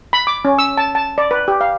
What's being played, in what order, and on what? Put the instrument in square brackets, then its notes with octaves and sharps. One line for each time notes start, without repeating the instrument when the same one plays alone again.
[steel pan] B5
D6
C#4
E6
A5
A5
D5
B4
G4
F5